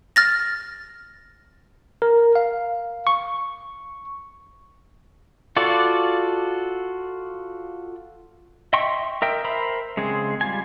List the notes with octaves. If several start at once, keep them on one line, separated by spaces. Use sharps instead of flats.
F6 A6 A#6
A#4
F5
C#6
F4 F#4 A4 D5
D#5 E5 G5 C6 C#6
A#4 D#5 E5 G5
A#4 C5 E5 A#5 B5
C#3 G#3 C4 G#4
G3 F4 G#5